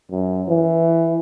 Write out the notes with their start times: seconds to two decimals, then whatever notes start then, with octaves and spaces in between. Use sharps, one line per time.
0.11 F#2
0.48 E3